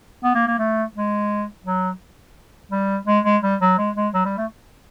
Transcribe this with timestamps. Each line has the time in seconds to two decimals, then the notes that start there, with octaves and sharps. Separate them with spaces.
0.24 B3
0.35 A#3
0.47 A#3
0.59 A3
0.95 G#3
1.65 F#3
2.72 G3
3.07 G#3
3.25 G#3
3.42 G3
3.61 F#3
3.78 G#3
3.96 G#3
4.14 F#3
4.25 G3
4.37 A3